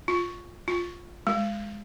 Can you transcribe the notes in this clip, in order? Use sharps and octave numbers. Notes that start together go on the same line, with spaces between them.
F4
F4
G#3